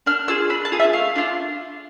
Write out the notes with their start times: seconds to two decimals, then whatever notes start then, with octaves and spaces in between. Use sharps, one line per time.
0.06 D4 F6
0.28 F4 G#4 E6
0.50 D4 B5
0.65 A5
0.72 F4 G#4
0.80 E5
0.93 A3 F5
1.16 D4 F4